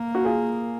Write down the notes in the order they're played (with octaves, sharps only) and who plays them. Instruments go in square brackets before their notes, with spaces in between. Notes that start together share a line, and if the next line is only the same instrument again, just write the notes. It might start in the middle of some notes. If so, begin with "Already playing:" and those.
Already playing: [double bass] A#3
[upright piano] F#4
F4 G#4